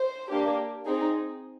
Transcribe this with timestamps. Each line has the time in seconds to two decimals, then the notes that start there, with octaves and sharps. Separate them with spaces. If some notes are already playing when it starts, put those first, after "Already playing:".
Already playing: C5
0.31 A#3 D4 G4
0.85 C4 D#4 G#4